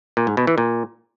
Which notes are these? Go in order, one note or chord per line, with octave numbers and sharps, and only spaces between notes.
A#2
G#2
B2
E3
A#2